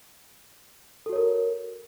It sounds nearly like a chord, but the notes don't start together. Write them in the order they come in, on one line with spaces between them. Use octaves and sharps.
A4 F#4 C#5 A#4